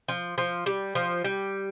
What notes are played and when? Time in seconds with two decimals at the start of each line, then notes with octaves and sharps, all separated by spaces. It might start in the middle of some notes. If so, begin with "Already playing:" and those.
0.08 F3
0.38 F3
0.66 G3
0.95 F3
1.24 G3